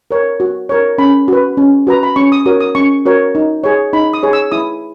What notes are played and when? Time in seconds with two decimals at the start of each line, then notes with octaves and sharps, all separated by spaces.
0.11 A#4 C#5
0.40 F#4
0.69 A#4 C#5
0.98 C#4 B5
1.28 F#4 B4
1.57 C#4
1.87 F#4 B4 A#5
2.03 B5
2.16 C#4 C#6
2.32 D#6
2.46 F#4 A#4 C#5 D#6
2.61 D#6
2.75 C#4 C#6
3.06 F#4 A#4 C#5
3.35 D#4
3.64 G#4 C#5
3.93 D#4 B5
4.14 D#6
4.23 G#4 C#5
4.33 E6
4.52 E4 D#6